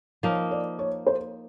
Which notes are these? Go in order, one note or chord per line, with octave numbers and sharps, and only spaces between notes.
F3 A#3 D#4 C#5
D5
C#5
C5